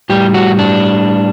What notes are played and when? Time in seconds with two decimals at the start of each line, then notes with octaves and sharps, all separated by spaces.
0.10 A2 G3 G4
0.34 F#4
0.59 D4